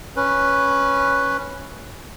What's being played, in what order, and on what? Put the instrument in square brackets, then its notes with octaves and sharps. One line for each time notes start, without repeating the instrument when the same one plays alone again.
[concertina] C#4 B4